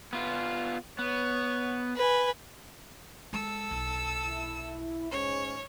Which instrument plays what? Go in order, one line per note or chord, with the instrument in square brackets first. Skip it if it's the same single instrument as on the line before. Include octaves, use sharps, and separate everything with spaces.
[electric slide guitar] B3 F4
[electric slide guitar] B3 [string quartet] C#5
[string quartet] B4 G#5
[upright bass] G#3 [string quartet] A4 E6
[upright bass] B1
[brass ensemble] E4
[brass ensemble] G#2 C#4 [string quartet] C#5